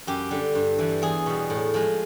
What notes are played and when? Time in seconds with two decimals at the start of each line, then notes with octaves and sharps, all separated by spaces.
0.07 F#2 G4
0.31 D3 G3
0.55 G2
0.78 E3 G3
1.02 E2 G#4
1.26 B2 G3
1.50 A2
1.74 F3 G#3